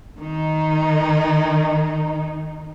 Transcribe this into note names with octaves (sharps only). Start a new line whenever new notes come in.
D#3 D#4